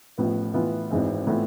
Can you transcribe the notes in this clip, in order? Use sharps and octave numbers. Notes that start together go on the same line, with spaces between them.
A1 A2 F3 B3
A2 E3 B3 F4
G#1 G#2 E3 G#3 C4
A2 E3 B3 F4 A4